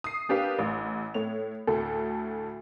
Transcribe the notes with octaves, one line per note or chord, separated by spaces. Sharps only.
D#6 C7
A#3 D4 G4 B4 F5
A1
A2 C#5 F7
D2 A2 A4